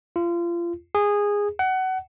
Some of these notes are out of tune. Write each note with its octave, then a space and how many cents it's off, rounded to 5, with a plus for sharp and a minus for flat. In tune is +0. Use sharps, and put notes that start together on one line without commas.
F4 -30
G#4 -15
F#5 +25